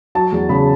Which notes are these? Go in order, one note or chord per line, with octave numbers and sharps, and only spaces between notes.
F#3 A5
E2
C#3 B5